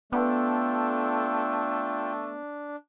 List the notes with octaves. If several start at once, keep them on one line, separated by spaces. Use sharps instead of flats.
A3 B3 D4 F4 A4 G5